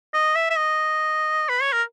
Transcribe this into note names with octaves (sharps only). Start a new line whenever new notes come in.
D#5
E5
E5
D#5
B4
C#5
A#4